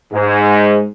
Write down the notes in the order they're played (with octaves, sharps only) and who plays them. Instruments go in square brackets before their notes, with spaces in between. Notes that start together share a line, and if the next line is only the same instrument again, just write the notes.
[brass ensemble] G#2